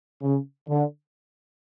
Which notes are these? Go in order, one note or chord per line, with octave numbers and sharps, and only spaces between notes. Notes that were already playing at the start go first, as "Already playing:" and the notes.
C#3
D3